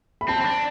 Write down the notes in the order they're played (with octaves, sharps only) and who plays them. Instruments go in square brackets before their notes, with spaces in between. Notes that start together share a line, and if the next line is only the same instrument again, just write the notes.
[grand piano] B5
[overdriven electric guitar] C4 [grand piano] A5
[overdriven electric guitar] C4
D4